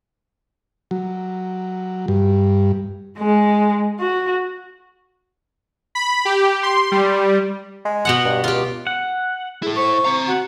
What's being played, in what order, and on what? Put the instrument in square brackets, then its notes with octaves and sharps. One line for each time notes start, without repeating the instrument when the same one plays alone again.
[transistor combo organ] F#3
G2
[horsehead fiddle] G#3
F#4
[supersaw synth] B5
G4
C6
G3
[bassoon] G#3
[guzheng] B2 B3 F#5
[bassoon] G2
[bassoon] C#2 [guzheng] F4 G4
[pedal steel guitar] F#5
[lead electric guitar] E4 A4 [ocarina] G#4
[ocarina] C5 [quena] C#6
[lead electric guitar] C4 A#5
[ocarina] F#4 [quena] F#5